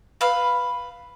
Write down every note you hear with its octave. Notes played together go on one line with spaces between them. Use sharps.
B4 F5